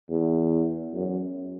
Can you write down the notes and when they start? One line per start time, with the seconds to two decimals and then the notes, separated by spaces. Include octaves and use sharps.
0.10 E2
0.94 F#2